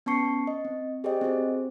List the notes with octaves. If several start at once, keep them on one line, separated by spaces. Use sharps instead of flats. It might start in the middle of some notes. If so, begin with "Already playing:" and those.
B3 C#4 A5 C#6 C7 C#7
D#5
C4
G4 G#4 C5 D5 D#5 G5
C4 F#4 G#4 C5